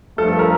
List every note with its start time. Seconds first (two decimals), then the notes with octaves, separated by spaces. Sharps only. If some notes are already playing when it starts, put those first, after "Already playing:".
0.18 G2 F3 A3 A4
0.39 A#4